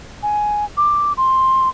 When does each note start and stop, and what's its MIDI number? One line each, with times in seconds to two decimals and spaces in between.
0.23 0.65 80
0.77 1.13 86
1.17 1.69 84